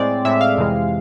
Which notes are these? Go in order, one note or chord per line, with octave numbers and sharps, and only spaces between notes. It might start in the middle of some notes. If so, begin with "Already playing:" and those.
Already playing: A2 G#3 C4 D5
A2 G#3 C4 E5
F5
F2 C3 E3 G#3